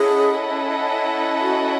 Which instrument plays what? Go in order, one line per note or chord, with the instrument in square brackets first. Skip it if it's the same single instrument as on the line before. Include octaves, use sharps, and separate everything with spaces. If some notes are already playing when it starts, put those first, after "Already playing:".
Already playing: [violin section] C#4 E4 A4 D#5 F#5 [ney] G#4
[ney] F#4